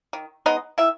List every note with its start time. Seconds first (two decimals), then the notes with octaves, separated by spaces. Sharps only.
0.13 D#3
0.46 G#3 B3 D#4 D#5
0.78 D#3 E4 E5